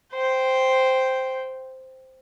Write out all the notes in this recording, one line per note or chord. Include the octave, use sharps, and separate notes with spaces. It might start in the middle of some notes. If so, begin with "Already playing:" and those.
C5 G5